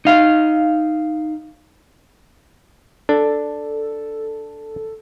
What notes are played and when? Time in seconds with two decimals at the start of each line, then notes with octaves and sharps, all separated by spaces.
0.05 D#4 F5
3.09 D4 A4